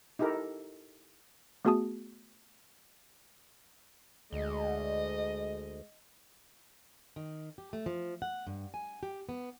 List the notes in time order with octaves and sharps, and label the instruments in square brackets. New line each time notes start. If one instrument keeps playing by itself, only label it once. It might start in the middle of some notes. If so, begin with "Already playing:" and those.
[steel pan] D#4 E4 G4 A4 A#4
[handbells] A3 B3 F#4 G#4 A5 D#6
[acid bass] D2 [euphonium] G#3 [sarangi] D#5
[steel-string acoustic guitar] D#3
G4
A3
F3
F#5
G2
G#5
G4
B3